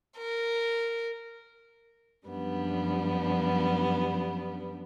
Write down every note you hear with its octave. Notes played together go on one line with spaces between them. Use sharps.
A#4
F#2 F3 G3 B3 D4